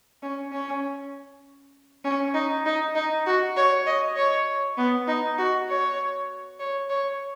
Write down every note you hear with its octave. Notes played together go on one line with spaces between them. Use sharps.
C#4
C#4
C#4
D#4
D#4
D#4
F#4
C#5
D#5
C#5
B3
D#4
F#4
C#5
C#5
C#5